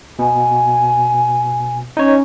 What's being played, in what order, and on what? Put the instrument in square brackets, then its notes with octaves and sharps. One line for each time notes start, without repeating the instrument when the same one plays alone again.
[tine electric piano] B2 [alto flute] G#5
[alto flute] C#4 [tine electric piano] D#4 C#5